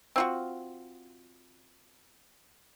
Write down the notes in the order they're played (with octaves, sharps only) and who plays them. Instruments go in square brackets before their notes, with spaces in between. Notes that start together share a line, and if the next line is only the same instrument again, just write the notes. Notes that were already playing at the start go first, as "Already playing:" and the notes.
[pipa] C4 F4 F#4